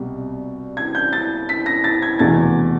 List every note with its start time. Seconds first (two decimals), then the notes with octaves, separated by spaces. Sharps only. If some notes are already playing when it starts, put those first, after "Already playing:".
Already playing: C2 B2 G3
0.77 G#6
0.95 G6
1.13 A6
1.49 B6
1.66 A#6
1.84 A6
2.02 G#6
2.19 F1 E2 B2 A6